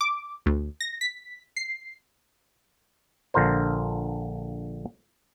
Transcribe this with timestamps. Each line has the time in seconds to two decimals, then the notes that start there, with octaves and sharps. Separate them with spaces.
0.01 D6
0.46 D2
0.80 A#6
1.01 B6
1.56 C7
3.34 A#1 D3 F4 A#4 C5